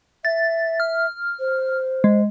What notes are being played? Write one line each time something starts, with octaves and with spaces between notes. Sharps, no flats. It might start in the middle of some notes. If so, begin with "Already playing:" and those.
E5 A6
F6
C5
G#3